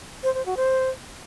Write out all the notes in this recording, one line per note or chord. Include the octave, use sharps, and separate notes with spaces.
C5
C5
F#4
C5